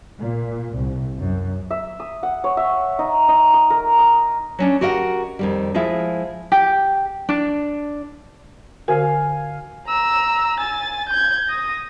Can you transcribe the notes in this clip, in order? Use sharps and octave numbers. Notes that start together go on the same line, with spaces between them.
A#2
C2
F#2
E5
D#6
F#5
C#5
E5
D#4
D#4
D#6
A#4
D#6
F#3 C#4 D4
F#4 G4 A#4 D#5 E5 F#5
F2 D#3 G3
F3 G#3 E4 F4 E5
G4
D4
D3 F#4 A#4 F5 G#5
A#5 E6
G#5 A6
G6 G#6
D#6 A#6